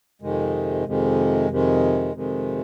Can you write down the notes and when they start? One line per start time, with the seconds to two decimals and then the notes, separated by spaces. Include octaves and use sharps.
0.22 F2 C3 D#3 G#3
0.86 F2 C3 D#3 G#3
1.50 F2 C3 D#3 G#3
2.13 F2 C3 D#3 G#3